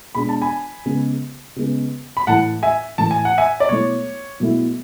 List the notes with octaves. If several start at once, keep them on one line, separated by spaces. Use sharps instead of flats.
B2 G#3 D4 B5
A5
G#5 B5
C#3 G#3 B3
C#3 G#3 B3
B5
A2 E3 A3 E4 F#5 A5
E5 G#5
A2 E3 A3 E4 A5
G#5
F#5
E5 G#5
D5
B2 F#3 A3 E4 C#5
B2 F#3 A3 E4